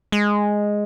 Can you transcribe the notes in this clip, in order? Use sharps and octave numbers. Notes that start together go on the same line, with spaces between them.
G#3